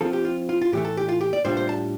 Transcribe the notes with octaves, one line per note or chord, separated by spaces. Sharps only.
F3 C4 F4 A4
G4
F4
F4
F4
A2 E3 A3 G4
A4
G4
F4
G4
D5
A2 G3 D4 F4 C5
C5
A5